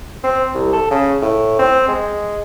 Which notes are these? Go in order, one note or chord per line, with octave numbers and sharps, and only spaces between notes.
C4
C2
A4
C#3
A2
C4
G#3